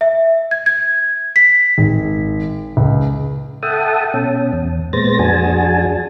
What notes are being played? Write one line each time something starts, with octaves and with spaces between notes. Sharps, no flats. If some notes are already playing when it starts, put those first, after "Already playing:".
E5
G#6
G#6
B6
G#1
C#2
A4 E5 F#5 G5 A5 D#6
B2 C#4
E2
A#2 G#3 B3 C5 A6 A#6
F2 D4 F#4 G#4 G#5 A5